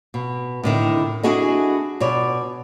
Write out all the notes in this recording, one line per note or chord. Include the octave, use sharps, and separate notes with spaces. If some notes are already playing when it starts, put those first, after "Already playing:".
B2
A2 D3 D#3
D4 E4 F#4 G#4 A4 D#5
B2 C#5 D5